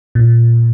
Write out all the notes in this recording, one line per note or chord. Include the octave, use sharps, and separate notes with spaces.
A#2